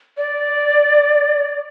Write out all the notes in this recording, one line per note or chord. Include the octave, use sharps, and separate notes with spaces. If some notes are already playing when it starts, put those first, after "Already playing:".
D5